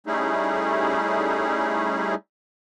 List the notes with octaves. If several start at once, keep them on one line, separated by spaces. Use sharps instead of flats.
G3 A3 C#4 D#4 E4 G#4